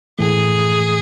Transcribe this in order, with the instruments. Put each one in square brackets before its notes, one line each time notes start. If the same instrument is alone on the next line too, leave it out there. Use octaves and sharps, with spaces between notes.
[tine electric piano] A2 E3 A3 [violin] G#4